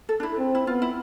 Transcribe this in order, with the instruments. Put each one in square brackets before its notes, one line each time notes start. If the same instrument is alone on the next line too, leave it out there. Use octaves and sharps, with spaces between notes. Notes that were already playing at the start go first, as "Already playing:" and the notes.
[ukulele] A4
D4
E4
[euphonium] C4
[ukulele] E4
[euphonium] B3 [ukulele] F4
[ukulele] E4